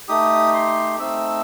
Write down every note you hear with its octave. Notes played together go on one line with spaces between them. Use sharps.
A3 D#4 G4 D#6
C6
A3 C4 D#4 E6